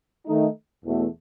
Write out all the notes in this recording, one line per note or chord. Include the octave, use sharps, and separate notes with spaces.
D#3 A3 D#4
E2 B2 A3